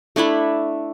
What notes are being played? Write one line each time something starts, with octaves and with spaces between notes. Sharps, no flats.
A3 D4 E4 B5